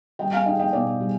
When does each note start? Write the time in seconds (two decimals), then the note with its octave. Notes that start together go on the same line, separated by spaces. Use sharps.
0.19 G3 D#5 G5
0.32 F5 G#5
0.46 D#4 D#5 G5
0.59 D#5 G5
0.73 B2 D5 F5
1.00 G3